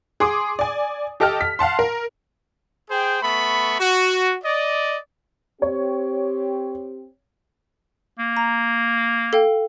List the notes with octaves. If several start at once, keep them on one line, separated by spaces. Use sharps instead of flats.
G#4 C6 D6 D#6
D5 G#5
G4 A4 D#5 G5 A5 F6
B6
F5 F#5 A5 C6
A#4
G#4 C5 G5
A3 B3 B5 C#6
F#4
D5 D#5
C4 G4 C#5
A#3
A#5
A4 F5 G5